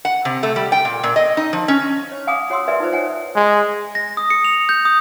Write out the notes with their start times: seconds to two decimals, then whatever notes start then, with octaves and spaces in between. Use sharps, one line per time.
0.05 F#5
0.25 C3
0.43 A3
0.56 G3
0.72 G5
0.85 A#2
1.03 A#2
1.16 D#5
1.37 D#4
1.53 F3
1.68 C#4
2.12 C#5
2.27 F5 F#5 G#5 A#5 D6 D#6
2.50 F#4 C#5 F#5 C6 D#6 E6
2.68 A#4 B4 D5 E5 G#5
2.80 D#4 F4 B4 C5
2.92 C#5 F#5 G#5
3.36 G#3
3.95 A#6
4.17 D#6
4.30 C#7
4.45 F7
4.69 G6
4.85 D#6